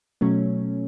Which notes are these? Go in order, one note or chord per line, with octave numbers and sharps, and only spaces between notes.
B2 F#3 A3 C#4